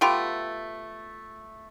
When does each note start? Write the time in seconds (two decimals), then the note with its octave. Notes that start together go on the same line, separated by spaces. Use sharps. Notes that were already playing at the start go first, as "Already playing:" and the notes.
0.01 A3 B3 F4 G4